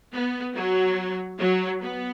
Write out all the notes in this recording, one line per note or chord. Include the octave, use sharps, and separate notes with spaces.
B3
F#3
F#3
B3